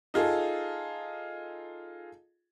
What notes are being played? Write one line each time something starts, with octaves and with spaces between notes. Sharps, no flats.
D#4 F4 G#4 A4